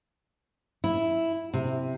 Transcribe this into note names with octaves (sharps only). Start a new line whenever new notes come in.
E4
C3